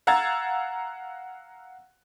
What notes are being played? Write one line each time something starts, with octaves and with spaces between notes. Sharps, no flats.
F5 F#5 A#5 E6 G#6 A6